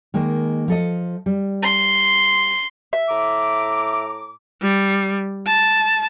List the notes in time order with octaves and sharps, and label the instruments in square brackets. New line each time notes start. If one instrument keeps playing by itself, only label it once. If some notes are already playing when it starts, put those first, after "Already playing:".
[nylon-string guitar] D#3 G#3 A#3
F3 A4 D#5
G3
[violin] C6
[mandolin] E5
[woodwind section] A2 A#5 D6
[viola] G3
A5